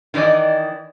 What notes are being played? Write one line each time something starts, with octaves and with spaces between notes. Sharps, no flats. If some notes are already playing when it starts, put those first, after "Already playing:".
D#3 E3 C#4 D5 D#5